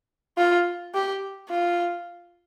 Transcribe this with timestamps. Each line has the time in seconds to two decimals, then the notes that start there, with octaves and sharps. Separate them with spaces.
0.38 F4
0.94 G4
1.50 F4